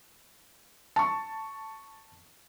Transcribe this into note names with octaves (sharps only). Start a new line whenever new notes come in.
A5 C#6